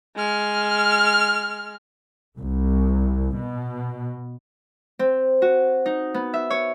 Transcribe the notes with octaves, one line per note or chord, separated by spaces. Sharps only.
G#3 F6
C2
B2
C4
F#4
D#4
B3
E5
C#5